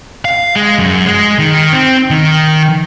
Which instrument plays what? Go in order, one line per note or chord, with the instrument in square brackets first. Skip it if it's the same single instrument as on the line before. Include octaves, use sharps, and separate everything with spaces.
[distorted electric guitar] F5
G#3
F#2
G#3
D#3
C4
D#3